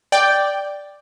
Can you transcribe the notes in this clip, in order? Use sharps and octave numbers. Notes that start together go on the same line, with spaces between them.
D5 G5